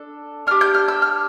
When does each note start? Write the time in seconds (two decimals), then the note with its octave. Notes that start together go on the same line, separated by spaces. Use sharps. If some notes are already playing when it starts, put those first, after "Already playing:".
Already playing: D4 A4
0.47 D4 F6
0.51 G4
0.61 G6
0.74 F6
0.88 E6
1.02 F6